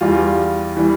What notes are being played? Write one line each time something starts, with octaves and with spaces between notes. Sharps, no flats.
E2 E3 G3 F4
E3 G3